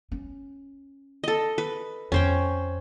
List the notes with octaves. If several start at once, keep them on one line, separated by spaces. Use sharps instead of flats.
C#4
A4 D#5
B4
F2 C#4 C5 G5